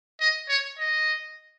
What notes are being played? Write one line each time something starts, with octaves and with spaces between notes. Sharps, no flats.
D#5
C#5
D#5